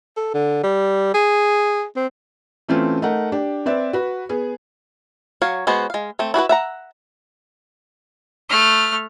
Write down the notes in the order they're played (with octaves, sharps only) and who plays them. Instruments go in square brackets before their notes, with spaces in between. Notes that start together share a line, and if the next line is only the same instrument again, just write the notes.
[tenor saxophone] A4
D3
G3
G#4
C4
[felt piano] E3 A3 C4 C#4 F4
A3 D#4 A#4 F#5
D4 G4
C4 B4 D5 E5
F#4 B4
B3 G#4
[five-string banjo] F#3 C#5 F5
G#3 B3 F#4 C5
G#3 F5
A3 C4
E4 F#4 G#4 B4
E5 F#5 A#5
[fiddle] A3 F6